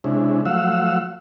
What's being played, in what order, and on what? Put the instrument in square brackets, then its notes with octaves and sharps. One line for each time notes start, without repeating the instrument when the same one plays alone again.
[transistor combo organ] C3 G#3 C#4 D4 E4
F3 F#3 A3 F5 F#5 E6